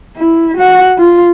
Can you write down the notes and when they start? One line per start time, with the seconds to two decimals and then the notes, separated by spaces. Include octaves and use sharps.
0.18 E4
0.57 F#4 F#5
0.98 F4